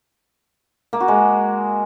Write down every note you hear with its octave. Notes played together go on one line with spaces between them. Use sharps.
A#3
F#4
G#3